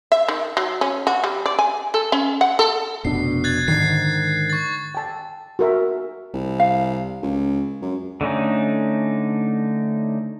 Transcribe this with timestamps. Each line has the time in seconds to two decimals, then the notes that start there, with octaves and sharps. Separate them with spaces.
0.12 E5
0.28 D#3
0.57 F#3
0.81 C#4
1.07 F#4
1.24 G3
1.46 D5
1.59 G#5
1.94 A4
2.12 C#4
2.41 F#5
2.59 A4
3.05 F1 B2 D4 C7
3.44 F#6 G#6 A6
3.68 G#2 D3 D#3 C7
4.50 C#6 A6
4.95 G5 A5
5.59 F#4 A#4 E5
6.34 C2
6.60 F5
7.23 C#2
7.82 F#2
8.21 D3 A3 C#4 D#4